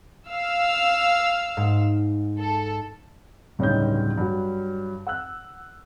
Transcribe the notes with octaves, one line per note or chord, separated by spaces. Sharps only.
F5 E6
G#2
A4
D1 G2 C#3 C#4 D#4 G6
G2 F#3
F#5 E6 F#6